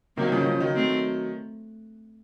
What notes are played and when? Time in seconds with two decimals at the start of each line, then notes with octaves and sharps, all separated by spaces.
0.17 C3 D#3 F#3 A#3
0.32 C#3 F3
0.41 D#3
0.46 C#3 F3
0.60 D#3 F#3
0.75 A3 C4